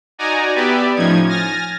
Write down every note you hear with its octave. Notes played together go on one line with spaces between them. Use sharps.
D#4 F#4 D5 G#5 A#5
B3 G4 B4 D5 E5
A2 F3 C#4 D#4 G#6
G#5 F6 A6 A#6